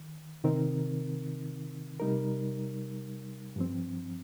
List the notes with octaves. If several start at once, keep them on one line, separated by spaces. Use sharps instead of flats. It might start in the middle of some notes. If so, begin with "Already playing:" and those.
Already playing: D#3
C3 D#3 C4 D#4 A#4
C3 G3 D#4 A#4
G2 F3 C4